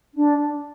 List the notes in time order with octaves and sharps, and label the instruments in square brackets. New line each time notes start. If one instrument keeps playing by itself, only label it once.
[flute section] D4